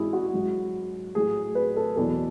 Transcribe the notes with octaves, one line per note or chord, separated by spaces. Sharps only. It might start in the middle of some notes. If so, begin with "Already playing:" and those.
Already playing: G#2 E3 E4 F#4 G#4
F#4
G#2 F#3
A2 F#3 G#4
B4
A4
E2 B2 F#3 A4